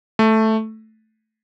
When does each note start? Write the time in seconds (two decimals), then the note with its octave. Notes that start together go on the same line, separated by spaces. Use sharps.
0.19 A3